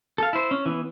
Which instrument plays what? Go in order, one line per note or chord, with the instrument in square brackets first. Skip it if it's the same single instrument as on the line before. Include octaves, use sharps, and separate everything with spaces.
[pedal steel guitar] A4 F5
E4 C5
C#4
E3 B3